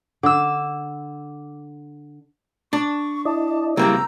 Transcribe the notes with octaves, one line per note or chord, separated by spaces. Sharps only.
D3 D6 E6
D4 C#6
E4 D5 D#5 A5
C#3 G3 A#3 C4 E4 A#5 E6 G6